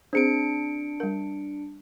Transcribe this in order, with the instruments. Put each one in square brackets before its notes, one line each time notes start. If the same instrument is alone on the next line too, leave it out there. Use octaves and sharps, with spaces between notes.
[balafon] C4 G#4 C5 [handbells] D4 C#7 D7
[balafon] G3 A#4